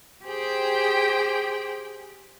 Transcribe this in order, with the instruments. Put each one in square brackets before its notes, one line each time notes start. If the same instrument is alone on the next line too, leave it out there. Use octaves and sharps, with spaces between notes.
[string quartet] G4 G#4 C5 G5